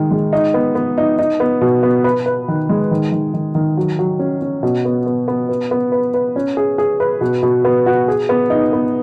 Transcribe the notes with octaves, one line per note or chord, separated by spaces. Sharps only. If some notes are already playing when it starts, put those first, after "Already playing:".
Already playing: D#3 G#3 D#4
G#3
D#4
B3
B3
D#4
D#4
B3
B2
B3
B4
B4
D#3
G#3
D#3
D#3
D#3
D#3
F#3
F#3
C#4
C#4
B2
B3
B3
B3
B4
B3
B4
B4
C#4
G#4
G#4
B4
B2
B2
B3
F#4
G#4
B3
D#4
B3